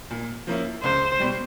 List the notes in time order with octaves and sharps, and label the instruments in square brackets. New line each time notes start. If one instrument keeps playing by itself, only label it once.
[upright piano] A#2
F3 A#3 C#4 E4
[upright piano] C#2 [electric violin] C5
[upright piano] B2 G3